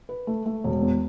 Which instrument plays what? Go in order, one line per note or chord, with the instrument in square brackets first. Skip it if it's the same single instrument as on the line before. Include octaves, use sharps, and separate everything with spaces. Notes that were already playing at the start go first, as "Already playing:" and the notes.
[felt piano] B4
A3
A3
E1
E2